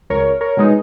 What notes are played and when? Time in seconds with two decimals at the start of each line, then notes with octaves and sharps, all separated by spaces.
0.10 C#2 A#4 C#5
0.41 A#4 C#5
0.57 B2 G#3 D#4